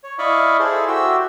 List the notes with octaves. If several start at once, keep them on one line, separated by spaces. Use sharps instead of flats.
C#5
E4 D5 D#5 F5 B5 C#6
E4 G#4 A4 C5
F#4 G4 E5 G5 E6